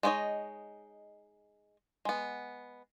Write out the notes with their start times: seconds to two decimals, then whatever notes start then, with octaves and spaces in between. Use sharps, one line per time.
0.03 G#3 B3 D#4 C#5 D#5
2.05 G#3 B3